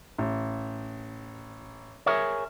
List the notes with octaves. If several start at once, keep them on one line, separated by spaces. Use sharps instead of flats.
A1
G#4 A#4 C#5 E5